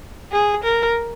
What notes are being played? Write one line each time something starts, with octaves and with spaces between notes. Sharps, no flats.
G#4
A#4